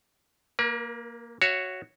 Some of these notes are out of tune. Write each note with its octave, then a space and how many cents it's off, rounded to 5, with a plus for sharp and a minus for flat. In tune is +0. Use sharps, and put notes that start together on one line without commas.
A#3 +0 A#4 +45
F#4 +0 C#5 +0 E5 +30